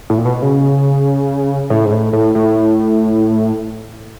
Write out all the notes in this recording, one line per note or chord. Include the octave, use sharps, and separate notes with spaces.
A2
A#2
B2
C#3
A2
G#2
A2
A2
A2